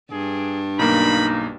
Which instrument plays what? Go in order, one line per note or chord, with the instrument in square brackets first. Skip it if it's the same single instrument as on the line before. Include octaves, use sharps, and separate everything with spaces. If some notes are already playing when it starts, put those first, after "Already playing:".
[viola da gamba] G2 D4 [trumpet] G#4
[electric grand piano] B1 A#3 [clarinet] D#4 [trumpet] B5